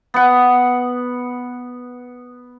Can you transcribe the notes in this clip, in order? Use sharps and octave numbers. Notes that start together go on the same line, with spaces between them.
B3 F#5